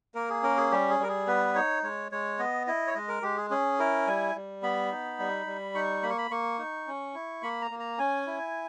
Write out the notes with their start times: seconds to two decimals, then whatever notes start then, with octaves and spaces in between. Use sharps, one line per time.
0.15 A#3 A#4
0.30 G#4
0.43 C#4 A#4
0.57 G#4
0.71 G3 G4
0.90 G#4
0.99 G3 A#4
1.09 G#4
1.27 B3 B4
1.55 D#4 C#5
1.83 G#3 C#5
2.12 G#3 C#5
2.39 B3 D#5
2.67 E4 D#5
2.87 C#5
2.94 G#3 D#5
3.09 A#4
3.22 G#3 G4
3.37 G#4
3.50 C#4 G#4
3.79 E4 A#4
4.07 G3 G#5
4.35 G3
4.63 B3 B5
4.91 D#4
5.19 G3
5.46 G3
5.75 D#4 C#6
6.03 A#3 B5
6.10 C#6
6.18 B5
6.31 A#3 C#6
6.59 D#4
6.87 C#4
7.14 E4
7.43 A#3 B5
7.62 A#5
7.71 A#3
7.79 A#5
7.99 C#4 G#5
8.27 E4